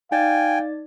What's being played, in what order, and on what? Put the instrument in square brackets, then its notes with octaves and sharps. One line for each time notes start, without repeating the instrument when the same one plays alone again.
[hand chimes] D#4 D5 A6 [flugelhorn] F5 [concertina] G5 G#5